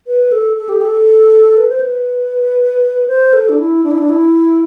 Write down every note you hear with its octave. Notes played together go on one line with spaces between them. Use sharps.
B4
A4
A4
G4
A4
B4
C5
B4
C5
A4
D4
E4
D4
E4
D4
E4